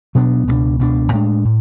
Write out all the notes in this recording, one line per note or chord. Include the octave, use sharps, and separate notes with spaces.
B2 F#3 B3 D4
C#2 B2 A3 D4
C#2 B2 A3 D4
A2 G#3 D4
A2